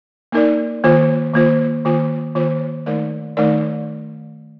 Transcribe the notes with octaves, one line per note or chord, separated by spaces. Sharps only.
A#3 D#4 A#4 D5
D#3 A#3 F4 C5
D#3 A#3 F4 C5
D#3 A#3 F4 C5
D#3 A#3 F4 C5
D#3 A3 D#4 A#4 D5
D#3 A3 D#4 A#4 D5